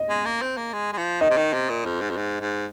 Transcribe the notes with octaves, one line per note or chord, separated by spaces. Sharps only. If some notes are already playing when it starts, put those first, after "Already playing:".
Already playing: D#5
G#3
A#3
C4
A#3
G#3
G#3
F3
D#3 D#5
C3
D#3
C3
A#2
F2
G#2
F2
G#2
G#2